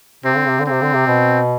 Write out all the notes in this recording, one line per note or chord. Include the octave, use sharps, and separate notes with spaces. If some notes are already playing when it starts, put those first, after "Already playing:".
C3 C4
D3
C3
D3
C3 C4
D3
C3
B2